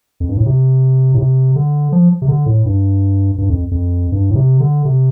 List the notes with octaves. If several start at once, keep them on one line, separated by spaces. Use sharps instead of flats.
F2
G2
A2
C3
A2
C3
D3
F3
C3
D3
A2
G2
G2
F2
F2
G2
A2
C3
D3
C3